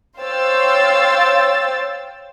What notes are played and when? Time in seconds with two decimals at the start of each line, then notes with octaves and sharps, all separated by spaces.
0.19 C5 C#5 F5 G5 E6 A6